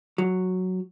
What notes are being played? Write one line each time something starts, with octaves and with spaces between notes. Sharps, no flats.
F#3